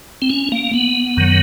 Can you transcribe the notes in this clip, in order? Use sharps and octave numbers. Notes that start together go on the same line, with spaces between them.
C4
C#4
A#3
B3
F#2 D#3 F#3